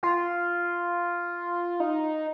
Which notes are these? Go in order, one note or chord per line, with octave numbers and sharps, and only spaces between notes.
F4
D#4